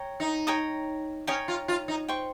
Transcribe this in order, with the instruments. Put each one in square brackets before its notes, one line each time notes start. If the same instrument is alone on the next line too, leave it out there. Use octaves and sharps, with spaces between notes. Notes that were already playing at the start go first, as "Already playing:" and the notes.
Already playing: [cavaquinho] C#5 G5 A#5
[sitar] D#4
[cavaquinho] C#5 G5 A#5 D#6
[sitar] C#4 [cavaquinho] C#5 G5 A#5 D#6
[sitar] F4
F4
D#4
[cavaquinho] C5 G5 C#6